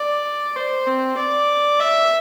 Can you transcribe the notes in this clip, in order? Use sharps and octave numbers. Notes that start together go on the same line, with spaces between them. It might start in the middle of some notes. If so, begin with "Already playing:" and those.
Already playing: D5
C5
C4
D5
E5